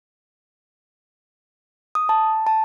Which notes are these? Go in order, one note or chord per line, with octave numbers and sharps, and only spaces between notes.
D#6
A5
A5